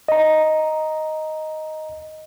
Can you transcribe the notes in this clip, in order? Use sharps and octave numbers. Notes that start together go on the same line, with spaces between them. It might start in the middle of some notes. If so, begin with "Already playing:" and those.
D#5 A#5